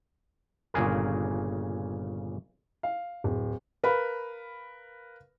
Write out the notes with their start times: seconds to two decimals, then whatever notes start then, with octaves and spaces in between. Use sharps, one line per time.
0.74 G1 A#2 C#3 G#4 A#4
2.83 F5
3.24 D1
3.84 A#4 B4 F5 B5